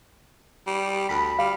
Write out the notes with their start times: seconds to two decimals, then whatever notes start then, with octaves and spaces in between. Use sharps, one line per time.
0.67 G3
1.09 D2 B5
1.39 G3 F5